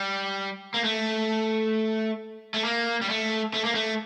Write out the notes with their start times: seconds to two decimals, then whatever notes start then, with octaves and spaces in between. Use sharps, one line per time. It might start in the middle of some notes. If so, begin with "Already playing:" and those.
Already playing: G3
0.74 A#3
0.84 A3
2.54 A3
2.64 A#3
3.02 G3
3.09 A3
3.54 A3
3.64 A#3
3.75 A3